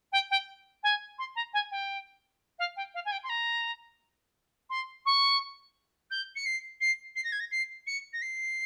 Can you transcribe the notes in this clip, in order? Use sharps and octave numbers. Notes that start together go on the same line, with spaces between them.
G5
G5
G#5
C6
A#5
G#5
G5
F5
G5
F5
G#5
G5
C6
A#5
C6
C#6
G6
C#7
C7
C7
C7
A#6
G#6
A#6
C7
C#7
A#6
C7